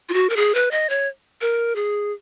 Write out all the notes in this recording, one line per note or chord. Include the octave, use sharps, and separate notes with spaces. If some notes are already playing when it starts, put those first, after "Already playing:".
F4
F#4
A#4
G#4
B4
D#5
C#5
A#4
G#4